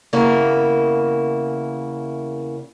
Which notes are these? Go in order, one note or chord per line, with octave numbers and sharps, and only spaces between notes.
E2 C#3 A#3 E4